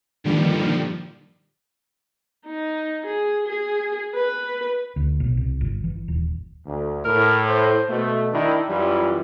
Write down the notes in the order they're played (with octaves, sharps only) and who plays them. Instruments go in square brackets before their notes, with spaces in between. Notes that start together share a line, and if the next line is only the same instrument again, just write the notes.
[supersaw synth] G2 A#2 D3 D#3 F3 G3
[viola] D#4
G#4
G#4
B4
[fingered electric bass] D2
B1
C2
G1
E3
D#1
[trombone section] D2
[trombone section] A2 [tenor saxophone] A#4
[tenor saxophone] C5
[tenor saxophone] B2 [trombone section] A3
[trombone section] D#3 E4 [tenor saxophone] D4
[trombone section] F#2 E3 F4 [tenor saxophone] G3